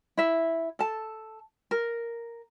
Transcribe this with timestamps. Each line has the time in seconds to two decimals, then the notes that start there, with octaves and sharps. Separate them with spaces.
0.17 E4 E5
0.79 A4 A5
1.71 A#4